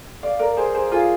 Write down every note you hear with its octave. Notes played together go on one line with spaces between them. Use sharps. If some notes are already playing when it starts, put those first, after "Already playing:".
D5 F5
A#4 D5
G#4 C5
G#4 C5
F4 G#4